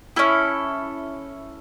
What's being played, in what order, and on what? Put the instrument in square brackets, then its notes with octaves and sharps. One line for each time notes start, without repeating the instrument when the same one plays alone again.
[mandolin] C#4 E4 A4